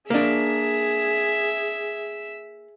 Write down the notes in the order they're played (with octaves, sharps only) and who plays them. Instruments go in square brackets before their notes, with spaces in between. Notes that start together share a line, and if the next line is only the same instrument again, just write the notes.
[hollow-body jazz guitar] A#3 D4 [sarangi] G#4 [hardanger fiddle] E5